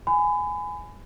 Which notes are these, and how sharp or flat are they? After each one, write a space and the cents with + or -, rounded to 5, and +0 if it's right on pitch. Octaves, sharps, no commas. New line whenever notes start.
G#5 +0 B5 +30